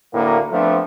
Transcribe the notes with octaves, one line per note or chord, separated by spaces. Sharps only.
D2 A2 A#3
F3 A3 B3 C4 D4